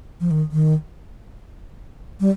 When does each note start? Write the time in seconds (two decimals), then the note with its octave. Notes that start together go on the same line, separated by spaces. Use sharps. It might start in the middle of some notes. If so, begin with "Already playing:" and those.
0.20 F3
0.31 D#3
0.52 D#3
2.20 G3